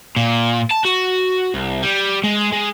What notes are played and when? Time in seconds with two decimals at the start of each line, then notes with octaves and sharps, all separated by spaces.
0.16 A#2
0.71 A5
0.85 F#4
1.54 C2
1.83 G3
2.24 G#3
2.52 G#3